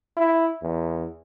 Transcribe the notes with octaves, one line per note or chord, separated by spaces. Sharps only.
E4
E2